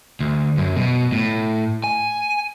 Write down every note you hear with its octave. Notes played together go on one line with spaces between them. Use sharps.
D2
F#2
B2
A2
G#5